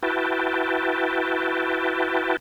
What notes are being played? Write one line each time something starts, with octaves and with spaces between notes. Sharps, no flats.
E4 F#4 B4 G5 A5